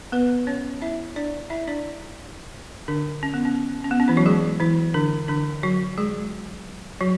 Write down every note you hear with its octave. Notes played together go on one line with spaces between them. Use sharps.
B3 B4
C#4 C#5
E4 E5
D4 D5
E4 E5
D4 D5
D3 D4
C#4
B3
C#4
C#4
B3
C#4
E3 E4
F#3 F#4
G#3 G#4
E3 E4
D3 D4
D3 D4
F#3 F#4
G#3 G#4
F#3 F#4